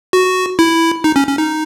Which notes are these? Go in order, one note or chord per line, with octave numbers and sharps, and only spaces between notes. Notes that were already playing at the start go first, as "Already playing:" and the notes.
F#4
E4
D#4
C#4
C#4
D#4